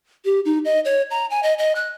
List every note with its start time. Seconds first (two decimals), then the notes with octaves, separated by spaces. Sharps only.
0.25 G4
0.45 D#4
0.65 D#5
0.85 C#5
1.11 A#5
1.31 G#5
1.43 D#5
1.58 D#5
1.75 F#6